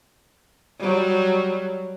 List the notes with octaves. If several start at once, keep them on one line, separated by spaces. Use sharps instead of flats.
F#3 G3